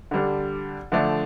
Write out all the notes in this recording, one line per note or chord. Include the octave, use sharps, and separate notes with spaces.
D3 G3 D4
D3 F3 A3 D4